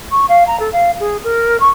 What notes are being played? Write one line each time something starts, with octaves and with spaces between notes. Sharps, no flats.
C#6
F5
A#5
A4
F5
G#4
A#4
C#6